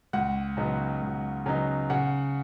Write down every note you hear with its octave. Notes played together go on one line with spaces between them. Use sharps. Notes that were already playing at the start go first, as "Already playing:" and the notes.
C#2 F#5
C#3 F#3 B3 D#4
C#2
C#3 F#3 B3 D#4
C#3 F#5